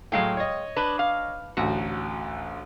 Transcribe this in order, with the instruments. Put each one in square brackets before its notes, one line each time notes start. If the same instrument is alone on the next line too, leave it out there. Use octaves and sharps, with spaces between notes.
[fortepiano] A2 F#3 [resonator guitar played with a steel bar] G#3 F5 G5
[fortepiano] C#5 D#5
[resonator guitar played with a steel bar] D4 B4
F5
[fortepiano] A1 D2 [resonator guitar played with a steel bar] F#4